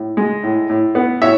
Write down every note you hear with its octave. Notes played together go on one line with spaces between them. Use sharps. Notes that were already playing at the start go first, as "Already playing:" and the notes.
Already playing: A2
G#3
A2
A2
B3
A2 C#5 E5